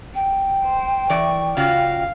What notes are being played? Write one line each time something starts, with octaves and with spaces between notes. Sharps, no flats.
G5
C5
E3 D5 C#6
C#3 F4 F#4 F5